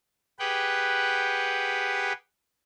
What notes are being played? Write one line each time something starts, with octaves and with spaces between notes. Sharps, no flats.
G4 G#4 B4 F#5 G5